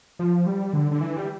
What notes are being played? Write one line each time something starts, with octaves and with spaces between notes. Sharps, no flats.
F3
G3
D3
D3
E3
G3